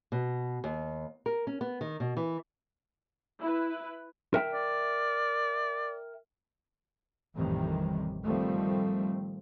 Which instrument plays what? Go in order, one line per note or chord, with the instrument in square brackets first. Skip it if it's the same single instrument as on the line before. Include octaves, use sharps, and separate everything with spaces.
[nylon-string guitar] B2
D#2
A#4
C#4
B3
D#3
B2
E3
[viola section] E4 B4
[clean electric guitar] A#4 E5 G5
[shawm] D5
[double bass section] A1 F2 C3 D#3 E3 G3
D#3 F3 G3 A3 C4